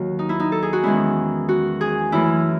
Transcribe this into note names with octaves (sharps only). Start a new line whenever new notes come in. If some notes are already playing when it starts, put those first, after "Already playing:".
Already playing: D#2 D#3 F#3 F#4
D#4
E4
D#4
A4
G#4
F#4
E2 D#3 G#3 C#4 E4
F#4
G#4
F#2 E3 A3 E4